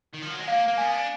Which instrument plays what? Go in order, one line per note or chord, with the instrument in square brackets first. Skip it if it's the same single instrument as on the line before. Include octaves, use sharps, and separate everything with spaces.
[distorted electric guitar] D#3
F3
F#3
G#3
[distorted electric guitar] A#3 [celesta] F5
[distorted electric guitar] A#3
[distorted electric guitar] B3 [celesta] G#5
[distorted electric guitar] D4